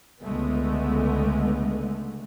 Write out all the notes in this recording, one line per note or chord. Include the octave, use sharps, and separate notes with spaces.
C#2 D3 G#3 A3 B3